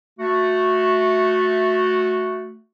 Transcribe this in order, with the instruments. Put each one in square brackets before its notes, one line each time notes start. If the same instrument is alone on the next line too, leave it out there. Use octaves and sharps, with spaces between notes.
[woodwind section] A3 F#4